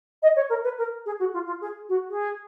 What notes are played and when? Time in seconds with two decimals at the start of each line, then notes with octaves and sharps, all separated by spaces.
0.23 D#5
0.36 C#5
0.50 A#4
0.64 B4
0.78 A#4
1.06 G#4
1.20 F#4
1.34 F4
1.47 F4
1.61 G#4
1.89 F#4
2.10 G#4